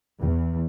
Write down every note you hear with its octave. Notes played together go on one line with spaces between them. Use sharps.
E2